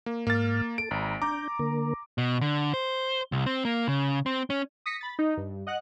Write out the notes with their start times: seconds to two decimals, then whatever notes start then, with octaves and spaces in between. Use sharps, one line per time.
0.06 A#3
0.27 G#2 A#3 F6 A6
0.78 A4 D7
0.91 G#1 A#5 B5
1.22 D4 A#5 D6 G6
1.59 D3 A#3 A#4
2.18 B2
2.41 D3
2.74 C5
3.32 C2
3.46 C4
3.65 A#3
3.88 C#3
4.26 C4
4.50 C#4
4.86 D#6 A#6 B6 C#7
5.01 B5 A6
5.19 D#4
5.37 G2
5.67 D#5 F#5 F#6